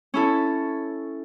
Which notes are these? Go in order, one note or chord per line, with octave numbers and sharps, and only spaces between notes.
C#4 E4 A4